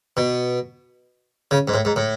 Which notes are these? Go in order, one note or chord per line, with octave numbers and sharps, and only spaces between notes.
B2
C#3
G#2
A2
G#2
A2